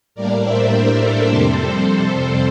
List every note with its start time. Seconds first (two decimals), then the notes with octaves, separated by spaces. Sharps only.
0.15 A2 G3 A#3 D4 A#4 D5
0.43 C5 E5
0.71 A#4 D5
1.00 A4 C5
1.29 F2 C3 G3 C4